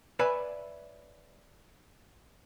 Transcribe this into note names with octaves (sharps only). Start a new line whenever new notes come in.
B4 C#5 D5 E5 G#5 B5